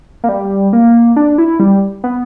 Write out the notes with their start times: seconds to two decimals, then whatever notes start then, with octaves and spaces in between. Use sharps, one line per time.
0.24 A#3
0.29 G3
0.73 A#3
1.16 D4
1.38 E4
1.60 G3
2.04 B3